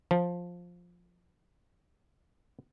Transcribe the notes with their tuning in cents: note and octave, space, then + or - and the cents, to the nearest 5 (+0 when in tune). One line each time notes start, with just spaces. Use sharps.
F3 +10